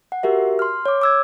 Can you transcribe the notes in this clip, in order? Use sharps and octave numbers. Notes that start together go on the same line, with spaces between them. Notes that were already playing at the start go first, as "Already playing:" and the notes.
F#5
F#4 G4 A#4 E5
C6 F6
C#5 D6
D6 E6 G#6